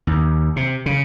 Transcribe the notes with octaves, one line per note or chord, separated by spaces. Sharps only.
D#2
C3
C#3